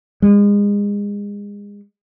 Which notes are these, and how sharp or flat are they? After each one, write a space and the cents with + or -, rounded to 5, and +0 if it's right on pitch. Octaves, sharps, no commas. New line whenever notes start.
G#3 -30